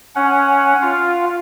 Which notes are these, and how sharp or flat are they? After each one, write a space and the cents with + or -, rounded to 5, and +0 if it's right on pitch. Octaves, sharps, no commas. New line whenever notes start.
C#4 +0 F#5 +0
F4 +0 F5 +0